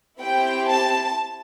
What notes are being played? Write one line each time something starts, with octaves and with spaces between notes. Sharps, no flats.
C4 E4 G4 G5
A5